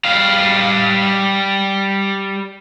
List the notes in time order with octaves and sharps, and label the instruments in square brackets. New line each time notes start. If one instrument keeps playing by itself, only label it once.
[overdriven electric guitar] G3 F5